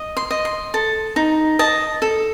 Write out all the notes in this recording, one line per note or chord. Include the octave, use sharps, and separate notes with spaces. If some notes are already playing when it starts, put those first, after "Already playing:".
Already playing: D#5
C6
D#5
C6
A4
D#4
D#5 A5
A4